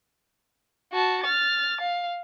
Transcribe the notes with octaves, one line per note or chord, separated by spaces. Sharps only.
F#4 A5
F6 A6
F5